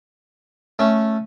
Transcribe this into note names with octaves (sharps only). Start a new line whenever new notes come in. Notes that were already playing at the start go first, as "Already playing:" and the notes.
A3 C#4